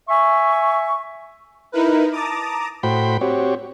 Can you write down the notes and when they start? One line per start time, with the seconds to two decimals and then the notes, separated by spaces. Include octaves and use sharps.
0.09 E5 G#5 C#6
1.72 D#4 E4 A#4 B4
2.11 A5 A#5 D6 D#6
2.83 A2 F#4 C5 G5 B5
3.21 C4 F#4 G4 C#5